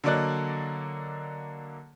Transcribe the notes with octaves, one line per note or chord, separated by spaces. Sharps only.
D3 F#3 A#3 D5 D#5 F#6